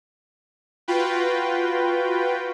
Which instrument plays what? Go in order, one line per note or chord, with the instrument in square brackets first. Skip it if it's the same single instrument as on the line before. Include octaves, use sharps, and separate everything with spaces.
[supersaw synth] F4 F#4 B4 G5